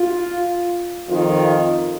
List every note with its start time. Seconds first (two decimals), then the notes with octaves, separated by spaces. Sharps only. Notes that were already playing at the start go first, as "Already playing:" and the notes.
Already playing: F4
1.08 F2 D#3 F4